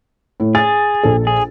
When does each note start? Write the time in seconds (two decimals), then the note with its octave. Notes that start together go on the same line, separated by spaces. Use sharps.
0.40 A2
0.55 G#4 A6
1.03 A#1 A4
1.27 G#4